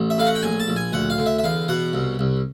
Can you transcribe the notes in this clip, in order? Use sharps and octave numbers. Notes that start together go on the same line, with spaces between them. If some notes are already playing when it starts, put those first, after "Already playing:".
Already playing: A1
E5
A2 F5
F#5
G5
A#1 G#5
A5
A#1
G#5
D2 F#5
F5
D3
E5
E5
E2 F5
B2 F#5
C2
C2